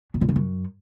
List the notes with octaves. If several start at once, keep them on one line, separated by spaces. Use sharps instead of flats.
B2
A#2
C#3
F#2